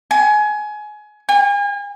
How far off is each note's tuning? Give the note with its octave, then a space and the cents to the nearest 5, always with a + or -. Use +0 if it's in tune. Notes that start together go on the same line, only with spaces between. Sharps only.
G#5 +25
G#5 -40